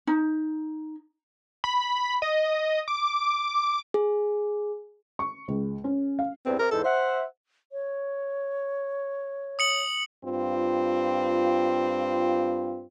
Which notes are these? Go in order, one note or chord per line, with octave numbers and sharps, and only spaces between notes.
D#4
B5
D#5
D6
G#4
C#6
C#2
C#4
F5
E2 G2 C4
C3 A#4
E2 G#2 A4 C5
C5 E5 F#5
C#5
D#6 C#7 F#7
G2 C4 F4